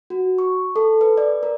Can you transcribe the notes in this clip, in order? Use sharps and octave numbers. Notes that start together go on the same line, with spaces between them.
F#4
C#6
A4
B4
D5
A#4